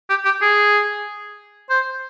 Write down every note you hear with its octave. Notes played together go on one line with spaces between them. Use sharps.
G4
G4
G#4
C5